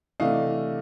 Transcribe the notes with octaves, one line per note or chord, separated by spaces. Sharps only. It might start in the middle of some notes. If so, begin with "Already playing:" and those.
C3 E3 A3 D4 D#5 F5